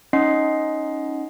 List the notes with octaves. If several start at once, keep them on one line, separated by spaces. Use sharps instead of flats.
C#4 D#4 D#5 F#5 C6 C7